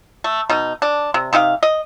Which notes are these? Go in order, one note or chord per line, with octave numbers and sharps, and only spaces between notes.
A3
B2 D#4
D4
C3
C3 D#4 G4 F5
D#5